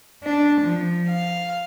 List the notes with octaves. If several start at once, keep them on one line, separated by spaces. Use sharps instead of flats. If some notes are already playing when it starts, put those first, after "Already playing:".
D4
F3
F5